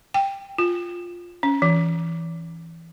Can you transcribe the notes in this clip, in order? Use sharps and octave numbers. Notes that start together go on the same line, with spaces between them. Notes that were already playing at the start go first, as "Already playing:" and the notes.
G5
F4
C#4
E3